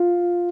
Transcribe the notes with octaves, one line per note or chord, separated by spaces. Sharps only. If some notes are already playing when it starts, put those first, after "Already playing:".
Already playing: F4